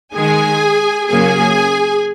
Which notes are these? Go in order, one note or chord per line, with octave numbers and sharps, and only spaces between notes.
D#3 G#3 G#4 G#5
C#3 F#3 A#3 G#4 G#5